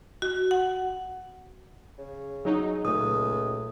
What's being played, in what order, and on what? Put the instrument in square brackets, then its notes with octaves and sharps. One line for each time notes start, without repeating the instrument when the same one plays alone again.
[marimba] F#4
F#5
[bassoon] C#3
[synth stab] F#3 D#4 [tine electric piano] G#4
[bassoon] C#2 [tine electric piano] A#2 A3 [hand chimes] D#6